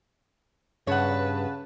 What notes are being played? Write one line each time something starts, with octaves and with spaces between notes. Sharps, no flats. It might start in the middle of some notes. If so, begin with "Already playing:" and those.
G2 C#3 B4 C#5 F#5 A5